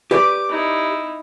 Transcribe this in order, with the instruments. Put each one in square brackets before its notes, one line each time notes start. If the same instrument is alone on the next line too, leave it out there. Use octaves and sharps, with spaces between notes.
[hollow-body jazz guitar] G4 B4 D5 [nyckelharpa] D6
[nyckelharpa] D#4 E4